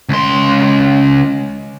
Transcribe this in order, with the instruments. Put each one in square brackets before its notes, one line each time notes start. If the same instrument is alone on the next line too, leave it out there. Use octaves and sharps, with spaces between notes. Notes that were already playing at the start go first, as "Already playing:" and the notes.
[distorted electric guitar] C#2 C6